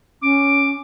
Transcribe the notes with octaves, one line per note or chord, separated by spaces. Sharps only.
C#4 D6